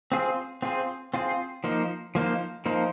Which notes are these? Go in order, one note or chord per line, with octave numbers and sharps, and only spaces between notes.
C4 F4 G#4 C5
C4 F4 G#4 C5
C4 F4 G#4 C5
F3 A#3 D#4 C5
F3 A#3 D#4 C5
F3 A#3 D#4 C5